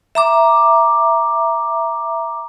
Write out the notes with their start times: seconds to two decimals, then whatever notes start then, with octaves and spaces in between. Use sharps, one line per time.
0.15 E5 A#5 D6